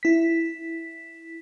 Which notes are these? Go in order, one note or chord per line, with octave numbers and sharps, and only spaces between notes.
E4 B6